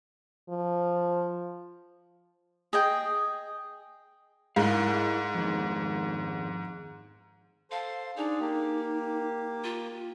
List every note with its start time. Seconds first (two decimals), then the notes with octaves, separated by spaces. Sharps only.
0.49 F3
2.73 G#4 D#5 G5
4.56 G#2 E4 A#4 F5
5.34 F2 D#3
7.71 A4 C5 F5 C6
8.17 D4 D#4 G#4
8.40 A#3 G4
9.64 F4